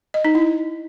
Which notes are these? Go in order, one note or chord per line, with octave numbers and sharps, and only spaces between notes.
D#5
D#4
E4